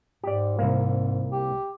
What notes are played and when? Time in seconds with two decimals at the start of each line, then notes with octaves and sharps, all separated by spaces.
0.24 G#2 G4 D5
0.59 C2 A#3
1.31 G4